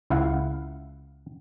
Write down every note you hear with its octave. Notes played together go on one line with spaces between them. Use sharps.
C#2 E4 F5 F#5